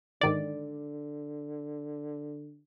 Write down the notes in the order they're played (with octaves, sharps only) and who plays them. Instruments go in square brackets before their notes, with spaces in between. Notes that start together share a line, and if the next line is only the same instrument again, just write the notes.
[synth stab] G#2 D#3 D5 [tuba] D3